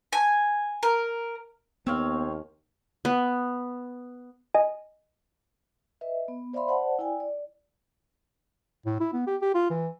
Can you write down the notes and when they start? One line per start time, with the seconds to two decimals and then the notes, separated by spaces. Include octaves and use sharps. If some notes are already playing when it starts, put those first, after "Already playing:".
0.13 G#5
0.83 A#4
1.87 D#2 B3 C4 C#5 F5
3.05 B3
4.54 D#5 G#5
6.01 B4 D#5 E5
6.28 B3
6.53 C5 D5 E5 F5 B5 C6
6.68 C5 D5 F#5 A5
6.99 E4 D5 G5 G#5
7.20 D5
8.86 A2
9.01 E4
9.14 B3
9.27 G4
9.42 G4
9.55 F4
9.70 E3